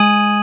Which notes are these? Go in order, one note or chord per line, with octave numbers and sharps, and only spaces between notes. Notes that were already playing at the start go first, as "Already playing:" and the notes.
Already playing: G#3 G#5 D#6 G#6 D#7 F#7